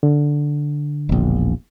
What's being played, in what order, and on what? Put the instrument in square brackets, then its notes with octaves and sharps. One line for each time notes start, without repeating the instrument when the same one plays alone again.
[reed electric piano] D3
[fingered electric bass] E1 A#1